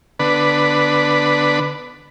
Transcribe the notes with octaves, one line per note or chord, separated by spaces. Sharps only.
D3 B3 D4 B4